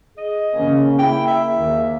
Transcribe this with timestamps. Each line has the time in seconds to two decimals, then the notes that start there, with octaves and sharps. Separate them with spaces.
0.18 G#4 D#5
0.54 C#3 A#3 C#4
0.99 A#3 E4 G5
1.27 E5
1.58 D#2 A#3